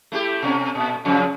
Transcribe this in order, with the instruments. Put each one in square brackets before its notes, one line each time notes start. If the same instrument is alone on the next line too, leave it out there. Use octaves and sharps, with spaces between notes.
[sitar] A3 E4 G4
B2 C#4
A#2
F2 C#3 F3